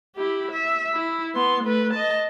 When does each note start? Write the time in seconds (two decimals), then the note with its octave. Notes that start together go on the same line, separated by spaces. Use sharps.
0.16 E4 G4
0.52 E5
0.95 E4
1.35 B3 C6
1.64 A3 B4
1.93 D#5 A5